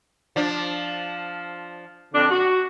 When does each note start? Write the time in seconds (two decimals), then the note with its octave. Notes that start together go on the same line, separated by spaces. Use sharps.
0.36 F3 D4
2.14 F2 D3 D4
2.30 F#4